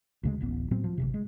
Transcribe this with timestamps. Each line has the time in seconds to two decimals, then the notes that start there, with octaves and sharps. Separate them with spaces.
0.23 D2 C#3 G#3
0.41 D1 A1 B3
0.71 A2 F#3 B3 C4
0.84 F3
0.98 G#1 F2 C3
1.14 G#3